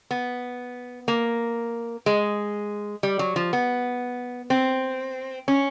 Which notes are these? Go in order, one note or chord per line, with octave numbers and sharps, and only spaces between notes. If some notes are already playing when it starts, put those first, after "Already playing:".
B3
A#3
G#3
G3
F#3
F3
B3
C4
C#4